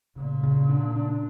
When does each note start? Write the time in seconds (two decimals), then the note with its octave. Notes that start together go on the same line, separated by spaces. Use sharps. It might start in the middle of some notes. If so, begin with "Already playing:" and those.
0.16 A#2 C#3
0.43 C#3
0.69 D4
0.96 D4